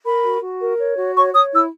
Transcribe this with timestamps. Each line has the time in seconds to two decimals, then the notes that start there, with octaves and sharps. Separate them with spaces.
0.04 A#4 B5
0.22 F#4
0.41 F#4
0.60 A#4
0.79 C#5
0.97 F#4
1.15 C#5 C#6
1.34 C#5 D#6
1.52 E4 E6